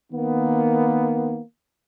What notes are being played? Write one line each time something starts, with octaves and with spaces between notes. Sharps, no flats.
D#3 A#3 B3